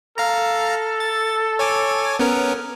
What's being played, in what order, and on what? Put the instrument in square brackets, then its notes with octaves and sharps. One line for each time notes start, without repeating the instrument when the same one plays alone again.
[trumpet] A4 [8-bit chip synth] F5 A#5
[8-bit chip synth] A6
C#5 G#5 D6
B3 C#4 A#4